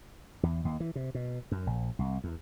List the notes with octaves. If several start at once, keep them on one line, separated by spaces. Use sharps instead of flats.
E2
D#2
E3
C3
B2
F#2
A#1
C2
E2